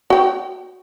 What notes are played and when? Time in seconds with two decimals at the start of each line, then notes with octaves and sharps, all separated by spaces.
0.10 F#4 G5